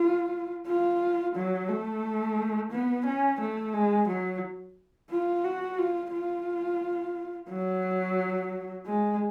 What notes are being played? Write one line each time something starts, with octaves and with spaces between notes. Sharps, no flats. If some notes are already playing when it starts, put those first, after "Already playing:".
Already playing: F4
F4
F#3
A3
B3
C#4
A3
G#3
F#3
F4
F#4
F4
F4
F#3
G#3